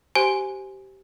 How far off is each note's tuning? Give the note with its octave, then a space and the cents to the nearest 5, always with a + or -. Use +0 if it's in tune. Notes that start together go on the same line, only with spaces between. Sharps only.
G4 -20 C5 -5 G#5 +0